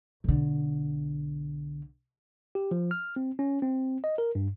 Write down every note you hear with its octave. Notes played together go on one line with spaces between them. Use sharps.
B1 D3
G4
F3
F6
C4
C#4
C4
D#5
A#4
G2